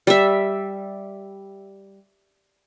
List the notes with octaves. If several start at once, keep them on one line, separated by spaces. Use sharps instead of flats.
G3 E5